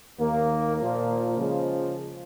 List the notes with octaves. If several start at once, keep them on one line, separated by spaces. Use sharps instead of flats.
D#2 D#3 A#3
A#2 F3 A#3
C#3 F3 G#3